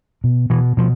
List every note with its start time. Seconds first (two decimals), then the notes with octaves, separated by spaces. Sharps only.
0.24 B2
0.50 B2 E3
0.77 B2 F3